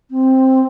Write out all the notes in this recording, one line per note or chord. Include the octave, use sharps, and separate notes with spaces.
C4